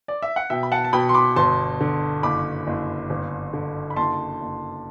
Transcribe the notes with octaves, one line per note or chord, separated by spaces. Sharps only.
D5
E5
F#5
B2 E5 G5
B5
F#5 A5
A5
B2 G5 B5
C6
B5 D6
G1 A5 C6
D3
F#1 B5 D6
F#1
G1
D3
B5
F#1 A5 C6
F#1